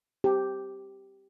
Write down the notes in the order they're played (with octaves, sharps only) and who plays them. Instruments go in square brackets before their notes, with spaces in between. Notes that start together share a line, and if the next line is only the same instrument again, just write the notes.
[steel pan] G4